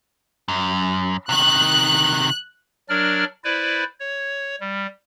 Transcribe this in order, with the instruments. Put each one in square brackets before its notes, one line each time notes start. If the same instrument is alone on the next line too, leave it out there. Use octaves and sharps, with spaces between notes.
[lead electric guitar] F#2
[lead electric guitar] C3 D#3 [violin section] F#6
[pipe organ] F#3 D4 A#4 D5 F6
E4 B4 C5 D5
C#5
G3